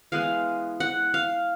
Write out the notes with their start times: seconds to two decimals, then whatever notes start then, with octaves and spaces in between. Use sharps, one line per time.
0.12 E3 G#3 B3 F5
0.80 F#5
1.14 F5